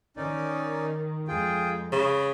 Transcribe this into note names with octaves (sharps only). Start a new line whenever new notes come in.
D#3 C#4 D#4 D5
F2 G#3 F4 G#4 G5
C#3 B5